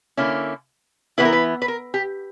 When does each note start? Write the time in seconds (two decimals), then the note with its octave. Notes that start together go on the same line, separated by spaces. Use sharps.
0.17 D3 A#3 C#4 E4
1.18 E3 B3 E4 B4
1.25 A#4
1.33 B4
1.62 B4
1.68 A#4
1.94 G4